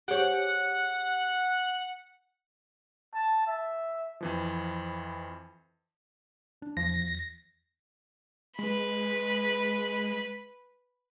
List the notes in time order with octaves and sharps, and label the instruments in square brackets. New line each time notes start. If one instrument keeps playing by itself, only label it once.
[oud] G4 G#4 C#5 [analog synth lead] F#5
[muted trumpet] A5
E5
[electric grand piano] F2 E3 F3
[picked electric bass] D4
[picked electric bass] E1 E2 [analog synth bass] F3 [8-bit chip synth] A#6
[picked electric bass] E2
[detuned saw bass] G#3 [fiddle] B4 B5